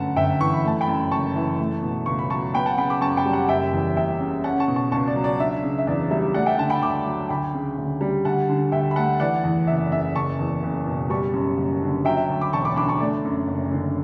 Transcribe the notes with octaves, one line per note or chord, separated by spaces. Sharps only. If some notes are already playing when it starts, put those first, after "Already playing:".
Already playing: G1 F#2 A3 F#5 A5
G1 E5 G5
E3 C#6
B5
A3 A5
G5 B5
F#2
F#1 A5 C#6
E3
A3
B2
C#2 C#6
B5
F#3 A5 C#6
B3 G5 B5
F#5 A5
C#3 G5 B5
B5 D6
F#2 A5 C#6
G5 B5
G3
F#5 A5
F#1 E5 G5
E2
F#1 E5 G5
C#3
C#4 F#5 A5
A5 C#6
B2
A5 C#6
C#2 A5 C#6
D5
F#3
D5
D4 E5
C#3
E5
E2 D5
G3 E5
A3 D5 F#5
E5 G5
D3 F#5 A5
G5 B5
D2 B5 D6
F#3
D2 G5 B5
C#3
D2
G3
D2 F#5 A5
D3
D2 E5 G5
B5
A3 F#5 A5
E3 D5 F#5
E2
F#1 E5
C#3 E5
F#1 A5 C#6
E2
F#1
B2
G3 A5 C#6
F#2
F#1
D3
F#3 E5 G5
E5
D2
B5 D6
E1 A5 C#6
B5 D6
D3 B5 D6
A5 C#6
A3 D5
F#2
F#1
D3